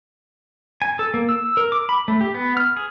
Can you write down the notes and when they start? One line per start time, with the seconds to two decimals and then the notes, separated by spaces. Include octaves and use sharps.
0.82 G#5
0.99 A4
1.14 A#3
1.29 E6
1.57 A#4
1.72 D6
1.89 B5
2.08 A3
2.21 G4
2.34 B3
2.57 F6
2.77 G#4